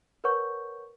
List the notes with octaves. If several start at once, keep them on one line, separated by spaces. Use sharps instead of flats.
A#4 B4 C#5 F#5 C#6 G6